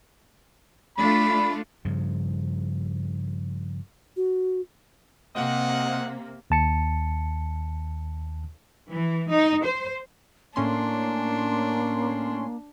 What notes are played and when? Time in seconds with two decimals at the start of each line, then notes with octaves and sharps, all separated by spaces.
0.98 A3 D4 F4 B5
1.85 G2 C#3 F3
4.17 F#4
5.36 C3 A#3 C4 D#5 F#5
6.50 D#2 A5 C#7
8.89 E3
9.30 D#4
9.63 C5
10.56 A2 A#3 C#4 D4 C6